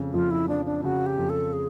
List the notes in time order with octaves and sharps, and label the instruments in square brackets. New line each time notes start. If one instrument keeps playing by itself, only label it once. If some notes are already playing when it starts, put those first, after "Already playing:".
Already playing: [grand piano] F2 C#3
[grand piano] F2 [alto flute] F4
[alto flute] E4
[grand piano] F3 [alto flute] D4
[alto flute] D4
[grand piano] C#3 [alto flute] F#4
[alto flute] G4
[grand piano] F2
[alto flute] A4
G#4